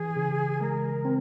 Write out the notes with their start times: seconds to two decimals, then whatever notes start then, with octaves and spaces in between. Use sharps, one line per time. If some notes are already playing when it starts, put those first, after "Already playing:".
Already playing: E3 G#4
0.17 C#3
0.61 G#3 A#4
1.05 C4